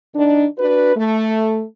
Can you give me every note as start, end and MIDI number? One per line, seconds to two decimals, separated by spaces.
0.15 0.45 51
0.15 0.45 62
0.58 0.94 62
0.58 0.94 66
0.58 0.94 71
0.97 1.64 57